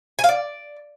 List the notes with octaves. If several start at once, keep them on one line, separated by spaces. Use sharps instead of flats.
G#5
F5
D5